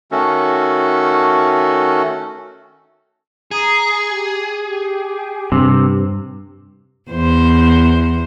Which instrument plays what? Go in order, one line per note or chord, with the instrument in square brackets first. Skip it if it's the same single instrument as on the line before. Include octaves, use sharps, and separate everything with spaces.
[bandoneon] D#3 A3 C#4 F#4 A4
[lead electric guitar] G#4 [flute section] A#5 D#6
[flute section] G4
G4
[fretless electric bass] G2 [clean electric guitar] C3
[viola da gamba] E2 C5